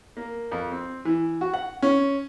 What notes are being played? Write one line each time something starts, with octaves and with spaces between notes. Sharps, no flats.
A#3
F2
C4
E3
F#4
F#5
C#4